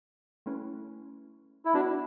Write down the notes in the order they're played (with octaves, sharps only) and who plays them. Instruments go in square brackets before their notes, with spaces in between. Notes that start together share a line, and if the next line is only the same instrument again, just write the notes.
[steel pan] A3 C#4 E4 B4
[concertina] E4
[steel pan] B3 F#4 B4 [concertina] D4